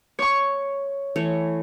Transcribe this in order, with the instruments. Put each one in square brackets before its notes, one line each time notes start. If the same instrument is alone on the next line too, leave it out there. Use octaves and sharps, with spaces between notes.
[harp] C#5 C#6
[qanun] E3 A3 C#5